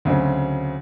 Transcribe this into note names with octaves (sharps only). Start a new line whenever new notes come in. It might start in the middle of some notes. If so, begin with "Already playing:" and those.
D2 C#3 F#3 C4